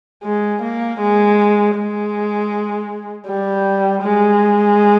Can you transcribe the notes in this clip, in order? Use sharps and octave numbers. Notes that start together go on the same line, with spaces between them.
G#3
A#3
G#3
G#3
G3
G#3